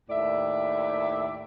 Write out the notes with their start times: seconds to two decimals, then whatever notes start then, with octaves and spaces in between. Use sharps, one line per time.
0.10 D#2 A2 D5 E5